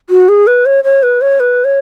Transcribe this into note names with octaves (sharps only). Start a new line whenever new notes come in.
F#4
G#4
B4
C#5
C#5
B4
C#5
B4
C#5